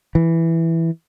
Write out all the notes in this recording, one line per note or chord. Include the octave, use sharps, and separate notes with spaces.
E3